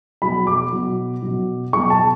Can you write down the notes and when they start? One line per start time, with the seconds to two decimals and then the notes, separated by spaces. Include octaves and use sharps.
0.22 B2 F#3 B5
0.47 D6
0.72 B2 F#3
1.22 B2 F#3
1.73 B2 F#3 C#6
1.90 A5